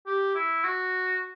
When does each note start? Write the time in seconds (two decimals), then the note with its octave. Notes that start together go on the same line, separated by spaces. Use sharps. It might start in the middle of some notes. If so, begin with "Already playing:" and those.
0.06 G4
0.35 E4
0.64 F#4